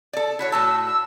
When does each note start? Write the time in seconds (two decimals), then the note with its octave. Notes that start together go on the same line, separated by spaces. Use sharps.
0.13 A4 D5
0.39 E4 F#4 C#5
0.52 A2 F#4 A5 E6
0.85 E6